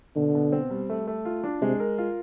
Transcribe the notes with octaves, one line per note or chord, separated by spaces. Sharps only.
B2 D3
B2
C4
G3
A3
A3
F4
D4
C3 G#3
A#4
F4